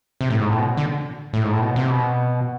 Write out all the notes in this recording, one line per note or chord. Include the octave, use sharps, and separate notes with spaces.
C3
A2
G#2
A2
B2
D3
A2
G#2
A2
B2
C3
B2